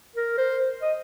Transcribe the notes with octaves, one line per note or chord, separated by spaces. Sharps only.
A#4
C5
D#5